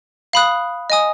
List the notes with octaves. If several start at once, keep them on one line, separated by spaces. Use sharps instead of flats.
F5 B5 D#6 F#6
D#5 G#5 D#6